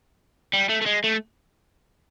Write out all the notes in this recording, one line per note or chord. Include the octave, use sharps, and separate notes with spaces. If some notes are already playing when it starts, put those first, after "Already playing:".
G3
A3
A3
G#3
A3